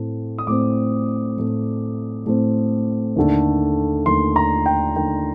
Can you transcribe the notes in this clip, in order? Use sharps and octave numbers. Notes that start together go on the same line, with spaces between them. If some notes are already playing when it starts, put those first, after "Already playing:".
Already playing: A2 A3 C4
D#6
A2 A3 C4 D6
A2 A3 C4
A2 A3 C4
D#2 D3 A3
D#2 D3 A3 C6
A#5
G5
D#2 D3 A3 G5